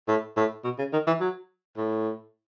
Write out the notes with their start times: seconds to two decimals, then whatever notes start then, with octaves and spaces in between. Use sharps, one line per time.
0.08 A2
0.37 A2
0.64 B2
0.78 C#3
0.93 D#3
1.07 E3
1.21 F#3
1.77 A2